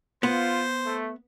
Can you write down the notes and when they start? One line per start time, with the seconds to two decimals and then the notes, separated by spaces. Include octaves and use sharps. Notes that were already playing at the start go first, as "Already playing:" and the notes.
0.23 B3 F4 C5
0.86 A3